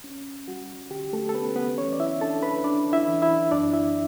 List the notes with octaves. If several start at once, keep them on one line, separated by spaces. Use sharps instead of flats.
C#4
G3 F#4
D3 G4
A3 A4
A4
B3 C#4 B4
B3 B4
E3 C#4 C#5
D5
E4 E5
D4 A4 A5
B4 B5
D4 D5
E4 E5
E3
E4 E5
F#2 D4 D5
E4 E5